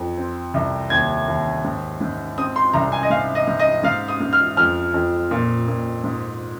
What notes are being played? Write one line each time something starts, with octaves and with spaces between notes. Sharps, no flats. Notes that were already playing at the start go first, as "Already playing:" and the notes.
Already playing: F2
C4
C2
D#2 G#6
D#2
G#2
G#2
C4 D#6
C6
C2 A#5
G#5
D#5
G#2 F5
D#5
G#2
D#5
G#2 F5
D#6
G#2
F6
F2 F6
F2
A#2
A#2
G#2